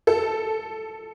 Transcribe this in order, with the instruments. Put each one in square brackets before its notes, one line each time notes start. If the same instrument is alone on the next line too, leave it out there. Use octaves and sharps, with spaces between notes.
[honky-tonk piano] A4